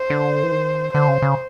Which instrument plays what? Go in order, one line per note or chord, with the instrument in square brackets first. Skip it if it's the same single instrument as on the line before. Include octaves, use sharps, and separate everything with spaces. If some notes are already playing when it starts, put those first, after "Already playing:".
Already playing: [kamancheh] C5
[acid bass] D3
E3
D#3
[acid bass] D3 [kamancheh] C5
[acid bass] C#3
C#3